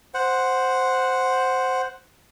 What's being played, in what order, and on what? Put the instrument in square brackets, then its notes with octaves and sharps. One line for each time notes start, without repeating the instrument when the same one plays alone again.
[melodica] C5 F#5